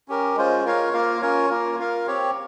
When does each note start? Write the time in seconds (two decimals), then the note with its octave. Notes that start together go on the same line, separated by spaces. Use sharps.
0.08 C#4 G4 A#4
0.36 G#3 C#4 F4 C5
0.65 F4 A#4 C#5 F5
0.93 A#3 F4 A#4 F5
1.21 C#4 F4 A#4 C#5
1.50 A#3 F4 A#4
1.78 F4 A#4 F5
2.07 C4 G4 C#5